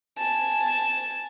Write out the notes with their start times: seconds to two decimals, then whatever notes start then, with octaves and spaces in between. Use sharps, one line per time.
0.18 G#5 A5